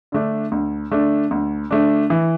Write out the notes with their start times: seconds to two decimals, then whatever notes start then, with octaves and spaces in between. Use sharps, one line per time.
0.12 D3 A3 D4
0.52 D2
0.92 D3 A3 D4
1.31 D2
1.71 D3 A3 D4
2.10 E3